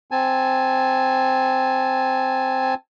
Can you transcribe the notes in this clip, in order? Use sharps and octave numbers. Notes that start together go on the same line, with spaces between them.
C4 G#5 A5